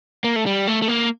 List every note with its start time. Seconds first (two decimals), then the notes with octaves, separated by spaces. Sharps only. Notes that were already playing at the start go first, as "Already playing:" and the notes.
0.24 A#3
0.36 A3
0.46 G3
0.67 A3
0.82 A3
0.88 A#3